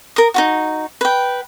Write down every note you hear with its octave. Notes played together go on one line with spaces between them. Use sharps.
A#4 D#6
D#4 F4 F#4
B4 G5